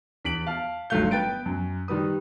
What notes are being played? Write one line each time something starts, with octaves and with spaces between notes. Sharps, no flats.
E2 B6 D7 F#7
F5 A5 F6
G1 D#3 F#3 A3 F5 G6
B3 B4 G5 A6 D7
F#2
D#3 G3 B4 D#6